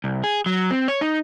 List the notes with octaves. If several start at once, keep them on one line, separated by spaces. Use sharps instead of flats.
C2
G#4
F#3
C4
C#5
D#4